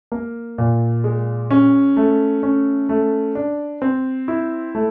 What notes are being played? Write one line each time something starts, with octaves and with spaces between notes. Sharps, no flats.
A#3
A#2
G#3
C#4
A3
C#4
A3
D4
C4
E4
A3